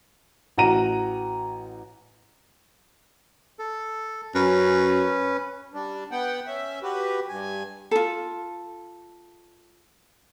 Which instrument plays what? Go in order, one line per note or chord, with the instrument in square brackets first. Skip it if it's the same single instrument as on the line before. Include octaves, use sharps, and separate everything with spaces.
[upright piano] A1 F#4 A#5 D#7
[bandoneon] A4
[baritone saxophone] F#2 [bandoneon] C#4 B4
[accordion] G3 D4
B3 F#5 G5
C#4 E5
F#4 G4 B4
G2 G#5
[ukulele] F4 A4